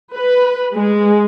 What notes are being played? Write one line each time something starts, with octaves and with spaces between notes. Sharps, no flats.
B4
G#3